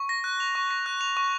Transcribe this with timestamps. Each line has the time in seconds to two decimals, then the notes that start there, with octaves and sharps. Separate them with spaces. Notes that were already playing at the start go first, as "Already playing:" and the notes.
Already playing: C#6
0.09 A#6
0.24 F#6
0.40 F7
0.55 C#6
0.71 A#6
0.86 F#6
1.01 F7
1.17 C#6